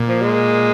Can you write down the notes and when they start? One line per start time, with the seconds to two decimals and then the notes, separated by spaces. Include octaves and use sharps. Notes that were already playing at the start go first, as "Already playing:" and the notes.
Already playing: A#2
0.08 F3
0.22 G#3